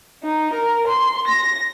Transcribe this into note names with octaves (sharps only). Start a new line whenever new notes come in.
D#4
A#4
C6
A#6